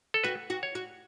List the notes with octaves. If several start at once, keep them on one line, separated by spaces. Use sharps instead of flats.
A4
F#4 B4
F#4
C#5
F#4